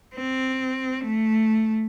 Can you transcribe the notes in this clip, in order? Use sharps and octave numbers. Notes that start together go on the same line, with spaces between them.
C4
A3